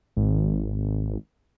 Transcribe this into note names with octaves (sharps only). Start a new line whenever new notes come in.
G#1